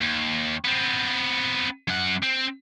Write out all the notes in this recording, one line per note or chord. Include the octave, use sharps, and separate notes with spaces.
D#2
B3 C4
F#2 F#5
C4